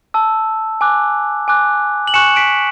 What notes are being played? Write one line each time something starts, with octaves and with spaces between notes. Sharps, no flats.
A5 E6
G#5 D6 F#6
G#5 D6 F#6
F#7
G#5 C#6 F#6 C#7 E7
B6 D7